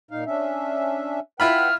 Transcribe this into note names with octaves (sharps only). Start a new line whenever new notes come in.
A#2 D#4 F5
C#4 D4 E5
E4 F4 B4 F#5 G5 B5 F6